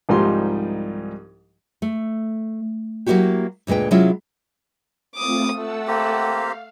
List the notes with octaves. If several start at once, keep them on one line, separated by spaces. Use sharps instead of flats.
C2 G#2 F3 G3 D#4 C6
A3
F#3 A#3 C#4 E4 F#4 G4
D2 A#2 G#3 B4 G5
C3 F#3 G#3 C#4 E4 F4
A3 C4 F4 D6 D#6
A3 F#5 A5 E6
A#3 C4 G4
F5